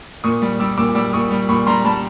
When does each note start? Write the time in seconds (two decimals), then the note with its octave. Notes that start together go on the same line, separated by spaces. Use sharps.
0.24 A#2 C#6 D#6
0.42 G3
0.60 G3 D6 E6
0.77 A#2 D6 E6
0.95 G3 D6 E6
1.13 A#2 C#6 D#6
1.31 G3
1.49 A#2 B5 C#6
1.67 G3 A#5 C6
1.85 G3 A5 B5